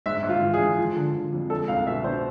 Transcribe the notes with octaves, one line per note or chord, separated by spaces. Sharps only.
G#2 E5
G#2
F4
E3
G#4
G#3
F3
D3
D3
F2
G#3 A4
C2 F5
B2 E5
B2 C5